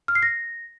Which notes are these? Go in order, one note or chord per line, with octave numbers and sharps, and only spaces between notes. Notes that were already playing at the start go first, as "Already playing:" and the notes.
F6
C7
A#6